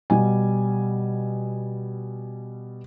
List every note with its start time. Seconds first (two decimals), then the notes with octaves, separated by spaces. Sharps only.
0.10 B2 G3 G#5